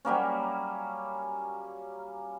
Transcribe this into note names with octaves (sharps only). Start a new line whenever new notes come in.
F#3 G3 A#3 C#4